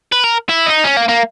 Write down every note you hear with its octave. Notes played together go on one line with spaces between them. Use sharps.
B4
A#4
E4
D#4
C#4
A#3
A#3